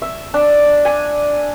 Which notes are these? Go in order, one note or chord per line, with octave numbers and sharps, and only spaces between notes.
E5
D4
G#5